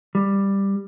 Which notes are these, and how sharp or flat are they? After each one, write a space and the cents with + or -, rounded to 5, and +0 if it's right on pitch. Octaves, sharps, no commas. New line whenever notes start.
G3 +10